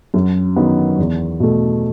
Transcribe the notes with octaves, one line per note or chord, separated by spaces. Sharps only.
F#2
D#3 F#3 B3
E2
B2 A3